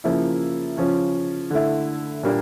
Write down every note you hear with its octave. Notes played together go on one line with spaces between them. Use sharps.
C#3 F3 A#3 E4
C#3 F3 C#4 F4
D3 A3 E4
A#2 G3 A#3 D4